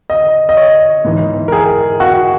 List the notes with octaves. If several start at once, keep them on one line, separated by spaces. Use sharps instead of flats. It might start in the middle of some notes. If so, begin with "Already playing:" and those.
D#5
D#5
C#5
G#2 E3
A#4
G#4
F#4